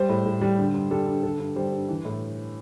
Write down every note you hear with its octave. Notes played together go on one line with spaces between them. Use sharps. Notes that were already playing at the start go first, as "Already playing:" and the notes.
Already playing: G3 C5
A2
A2
G3
D3
G2
G3 A4
G2
D3 A4
G2
G3 C5
G2
E3
A2